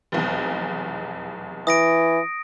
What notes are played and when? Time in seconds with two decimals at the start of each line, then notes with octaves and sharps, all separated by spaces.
0.12 F1 B1 E2
1.67 E3 D#6 A#6 D7